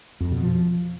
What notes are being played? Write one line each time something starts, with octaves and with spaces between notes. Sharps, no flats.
F2
B2
F3